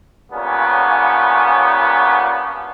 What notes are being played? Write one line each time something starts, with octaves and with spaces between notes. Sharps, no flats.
G2 A#2 C#3 B3 C#4